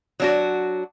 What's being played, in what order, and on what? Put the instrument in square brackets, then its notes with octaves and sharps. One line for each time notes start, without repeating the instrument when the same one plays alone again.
[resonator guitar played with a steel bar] F#3 D4 F#4